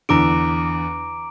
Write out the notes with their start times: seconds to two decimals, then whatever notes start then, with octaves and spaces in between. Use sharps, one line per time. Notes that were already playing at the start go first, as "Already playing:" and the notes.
0.09 E2 D3 A#5 D6 D7